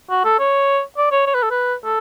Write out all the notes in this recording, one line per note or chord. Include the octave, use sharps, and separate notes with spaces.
F#4
A4
C#5
D5
C#5
C#5
B4
A4
B4
A4